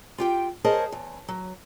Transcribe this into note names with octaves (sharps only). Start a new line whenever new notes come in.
F4 G4 G5
G#4 A#4 C5 C#5 D#5 A5
E2
F#3